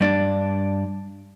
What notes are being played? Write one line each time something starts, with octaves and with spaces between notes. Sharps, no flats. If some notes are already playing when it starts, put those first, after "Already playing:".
G2 D4